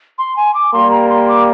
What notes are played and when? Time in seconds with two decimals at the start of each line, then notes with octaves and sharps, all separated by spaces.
0.18 C6
0.36 G#5
0.54 D6
0.73 G3 A#3 C6
0.91 A#5
1.09 C6
1.28 D6